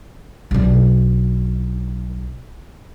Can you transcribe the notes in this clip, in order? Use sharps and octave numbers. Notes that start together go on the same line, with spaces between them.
B1 D4